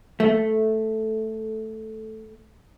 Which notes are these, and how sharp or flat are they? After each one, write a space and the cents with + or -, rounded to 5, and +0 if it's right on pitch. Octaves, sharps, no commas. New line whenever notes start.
A3 -5